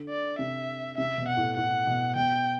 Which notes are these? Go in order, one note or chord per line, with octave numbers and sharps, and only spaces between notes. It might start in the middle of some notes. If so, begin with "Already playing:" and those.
Already playing: D3
D5
C3 E5
C3 E5
B2
F#5
A2
A2 F#5
B2
B2 G5